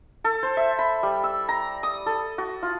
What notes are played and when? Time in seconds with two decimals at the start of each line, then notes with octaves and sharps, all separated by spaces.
0.24 A4
0.43 C5
0.57 E5
0.79 B5
1.03 G3
1.24 E6
1.49 A#5
1.83 D#6
2.06 A4
2.38 F#4
2.63 F4